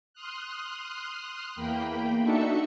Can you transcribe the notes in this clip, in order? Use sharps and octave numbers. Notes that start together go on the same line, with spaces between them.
C6 D#6 F6 F#6
E2 A#3 G5 B5
D4 D#4 F#4 A4 E5 C#7